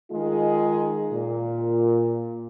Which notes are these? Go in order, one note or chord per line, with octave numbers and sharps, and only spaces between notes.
D#3 G#3 D#4 F4 G#4
A#2